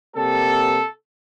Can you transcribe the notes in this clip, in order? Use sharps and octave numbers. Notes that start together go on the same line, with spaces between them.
C3 G3 A#3 A4